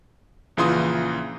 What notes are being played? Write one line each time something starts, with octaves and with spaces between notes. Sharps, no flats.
A#1 C#3 E3 F4 C6 D#6